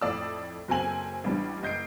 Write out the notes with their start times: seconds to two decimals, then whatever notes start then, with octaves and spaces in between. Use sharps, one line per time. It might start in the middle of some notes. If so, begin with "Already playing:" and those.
0.01 F2 A2 A4 D5 D#6 E6
0.68 F#1 F#3 C4 A4 G#5 F#7
1.24 A1 G3 D4
1.62 F#1 D#5 G6 C7 D7